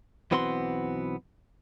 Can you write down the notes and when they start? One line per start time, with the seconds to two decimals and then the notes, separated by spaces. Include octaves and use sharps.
0.31 B1 E3 B3 C4 F#4 C6